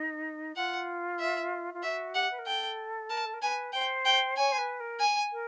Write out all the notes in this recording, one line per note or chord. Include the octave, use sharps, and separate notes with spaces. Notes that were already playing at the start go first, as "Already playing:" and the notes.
Already playing: D#4
F4 F#5
E5
F4
F#4 E5
G4 F#5
B4
A#4
A4 G5
A#4 A5
A4
A#4
B4 G#5
C5 G5
G5
C#5 G#5
C5
B4
A#4
G#5
A#4